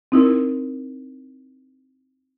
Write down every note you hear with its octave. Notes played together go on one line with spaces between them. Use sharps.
C4 D#4 E4 A#4